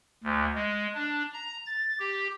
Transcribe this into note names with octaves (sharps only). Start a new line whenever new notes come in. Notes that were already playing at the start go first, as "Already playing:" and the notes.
D2
G#3
D4
A#5
A6
G4